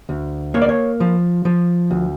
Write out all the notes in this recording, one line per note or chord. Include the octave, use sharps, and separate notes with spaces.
D2
A#3 C#5
D5
C#5
F3
F3
D2